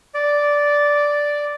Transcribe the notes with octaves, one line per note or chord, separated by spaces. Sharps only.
D5